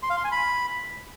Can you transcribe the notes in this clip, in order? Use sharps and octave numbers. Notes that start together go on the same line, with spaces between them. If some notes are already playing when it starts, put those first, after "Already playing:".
C6
F5
C6
G#5
B5